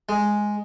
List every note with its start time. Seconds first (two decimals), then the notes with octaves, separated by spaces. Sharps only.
0.09 G#3